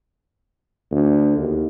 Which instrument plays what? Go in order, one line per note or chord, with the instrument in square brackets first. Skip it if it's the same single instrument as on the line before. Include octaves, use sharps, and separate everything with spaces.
[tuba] D2
D#2